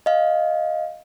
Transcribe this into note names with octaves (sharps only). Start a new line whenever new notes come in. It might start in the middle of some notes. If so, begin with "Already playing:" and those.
D#5 F5